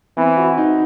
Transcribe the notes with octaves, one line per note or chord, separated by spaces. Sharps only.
E3 C4
F#4
D#4